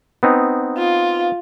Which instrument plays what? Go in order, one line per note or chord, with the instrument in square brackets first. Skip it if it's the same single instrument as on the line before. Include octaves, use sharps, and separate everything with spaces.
[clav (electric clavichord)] B3 C4 D#4
[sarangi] F4